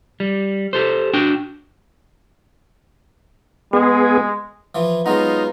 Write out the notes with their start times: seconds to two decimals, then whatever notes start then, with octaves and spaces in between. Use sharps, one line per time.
0.20 G3
0.73 G4 A4 C5
1.14 D4 F#4 G5
3.73 G#3 B3 G#4
4.75 E3 F3
5.06 F#3 G#3 B3 D#4 F4 A#5